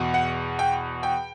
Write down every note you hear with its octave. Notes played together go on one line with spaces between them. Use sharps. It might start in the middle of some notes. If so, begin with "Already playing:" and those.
Already playing: E2 B2
F#5
G5
G5